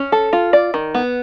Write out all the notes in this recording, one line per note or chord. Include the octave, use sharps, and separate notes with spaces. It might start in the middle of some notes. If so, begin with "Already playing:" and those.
Already playing: C#4
A4
F4
D5
D#3
B3